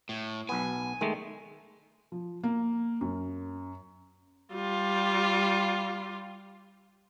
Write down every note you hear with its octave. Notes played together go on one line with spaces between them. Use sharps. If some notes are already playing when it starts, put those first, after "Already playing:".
A2
B1 B3 G#5
D#3 G#3 A3
F3
A#3
F#2
G3 F4